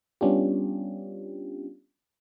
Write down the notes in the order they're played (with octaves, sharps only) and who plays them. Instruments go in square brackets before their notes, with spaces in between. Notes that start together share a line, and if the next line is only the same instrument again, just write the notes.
[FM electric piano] G3 B3 C#4 D4 F4 G4